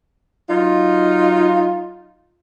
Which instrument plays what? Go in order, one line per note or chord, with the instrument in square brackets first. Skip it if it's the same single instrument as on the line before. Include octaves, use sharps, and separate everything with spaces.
[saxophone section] F#3 D#4 F4